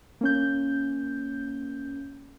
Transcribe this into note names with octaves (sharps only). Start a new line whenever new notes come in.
A#3 C#4 G6